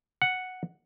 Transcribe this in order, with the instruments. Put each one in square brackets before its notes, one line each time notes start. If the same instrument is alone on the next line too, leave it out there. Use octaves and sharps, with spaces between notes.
[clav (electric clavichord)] F#5